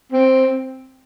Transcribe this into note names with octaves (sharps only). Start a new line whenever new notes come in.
C4